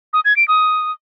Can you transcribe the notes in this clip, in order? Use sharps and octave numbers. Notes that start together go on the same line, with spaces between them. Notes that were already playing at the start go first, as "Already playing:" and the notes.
D#6
G#6
D7
D#6